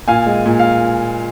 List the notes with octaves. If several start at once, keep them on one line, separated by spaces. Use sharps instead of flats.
A#2 F5 G#5
G#3
A#2
F5